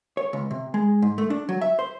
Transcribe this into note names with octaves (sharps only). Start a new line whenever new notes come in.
C#5
C#2
C3
G#3
G#2
A3
D4
F#3
E5
C5